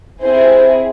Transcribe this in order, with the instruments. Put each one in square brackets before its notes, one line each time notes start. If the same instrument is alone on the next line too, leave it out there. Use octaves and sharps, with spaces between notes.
[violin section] C4 E4 G#4 C5